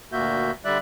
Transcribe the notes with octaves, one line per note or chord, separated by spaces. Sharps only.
D2 A#2 A#3 F#4 E5 G6
D3 G3 D5 E5 F#6